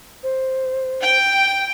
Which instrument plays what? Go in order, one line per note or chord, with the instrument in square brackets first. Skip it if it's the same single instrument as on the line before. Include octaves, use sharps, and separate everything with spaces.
[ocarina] C5
[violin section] G5